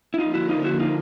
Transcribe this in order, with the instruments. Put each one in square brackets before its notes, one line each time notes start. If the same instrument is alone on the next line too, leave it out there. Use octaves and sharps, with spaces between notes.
[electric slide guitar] E4
[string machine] D3 F3 A#3 [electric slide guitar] D#4 F4
[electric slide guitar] E4 F#4
D#4 F4
E4 F#4
D#4 F4